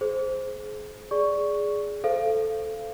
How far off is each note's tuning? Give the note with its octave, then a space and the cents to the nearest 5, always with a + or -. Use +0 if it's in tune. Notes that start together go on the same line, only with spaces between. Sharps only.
G#4 +35 C5 +0
G#4 +0 D5 -15 C#6 +5
A4 +0 C5 -10 F5 -25